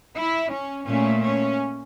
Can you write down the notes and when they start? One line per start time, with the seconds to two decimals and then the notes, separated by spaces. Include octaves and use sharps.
0.15 E4
0.51 C#4
0.87 A#2 A3 C#4
1.22 C#4